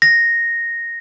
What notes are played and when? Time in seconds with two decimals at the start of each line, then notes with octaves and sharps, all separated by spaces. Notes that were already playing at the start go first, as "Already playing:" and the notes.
0.02 A#6